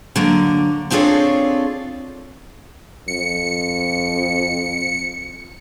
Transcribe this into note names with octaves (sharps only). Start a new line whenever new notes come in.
D3 F#3 A#3
C4 D4 F4 G#4 A4 C#5
F2 C#7